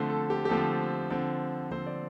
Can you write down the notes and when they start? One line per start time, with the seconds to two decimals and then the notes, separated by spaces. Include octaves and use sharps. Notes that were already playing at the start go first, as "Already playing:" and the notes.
Already playing: D3 F3 A3 C4 C5
0.10 A4
0.30 G4
0.45 G4
0.49 D3 F3 A3 C4 A4
1.11 D3 F3 C4
1.71 D3 F3 C4 C5
1.86 D5